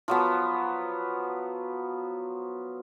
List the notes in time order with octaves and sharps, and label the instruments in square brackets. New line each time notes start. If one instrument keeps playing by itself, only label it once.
[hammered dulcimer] F3 F#3 B3